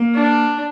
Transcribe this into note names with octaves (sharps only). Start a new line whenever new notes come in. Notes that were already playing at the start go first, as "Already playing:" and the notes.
Already playing: A#3
D4